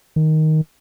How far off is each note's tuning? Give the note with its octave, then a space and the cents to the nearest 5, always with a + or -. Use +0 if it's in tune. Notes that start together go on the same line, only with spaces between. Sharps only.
D#3 +5